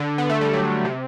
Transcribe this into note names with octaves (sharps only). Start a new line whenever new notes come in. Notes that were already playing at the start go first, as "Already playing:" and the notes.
Already playing: D3
B3
A3
G3
F#3
C3